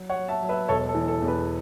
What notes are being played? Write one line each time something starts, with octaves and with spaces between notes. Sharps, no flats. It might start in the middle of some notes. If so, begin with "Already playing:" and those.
Already playing: F#3
C#5 F#5
F#3
E5 A5
F#3
B4 E5
E1 A4 C#5
A4
E3
A4
E2
B4